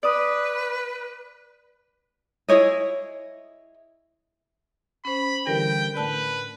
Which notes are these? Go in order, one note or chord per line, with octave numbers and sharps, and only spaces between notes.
B4 D5 D#6
E4 G#4 C#5 D#5
C#4 C5 B5
D3 E3 G3 A#4 G5
A2 D3 B4 D5 A5 F#6